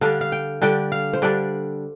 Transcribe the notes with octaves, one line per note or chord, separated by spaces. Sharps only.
D3 G3 D4 F5
F5
G5
D3 G3 D4 G5
F5
C5
D3 G3 D4 D5